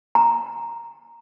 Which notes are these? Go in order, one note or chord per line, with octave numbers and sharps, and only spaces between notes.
A#5